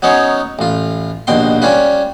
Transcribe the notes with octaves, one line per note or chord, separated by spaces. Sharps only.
F#3 B3 C#4 D#4 C#5
A1 F4
A#1 D#2 B2 G5 C6
G3 C#4 F4 B4